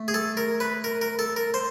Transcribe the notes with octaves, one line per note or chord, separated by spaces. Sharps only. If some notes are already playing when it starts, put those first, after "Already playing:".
Already playing: A3
G#4
A4
A#4
B4
A#4
A#4
A4
A#4
C5